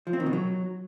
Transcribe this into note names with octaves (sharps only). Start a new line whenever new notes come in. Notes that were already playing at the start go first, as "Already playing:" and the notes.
F3
C4
D#3
B2
F#3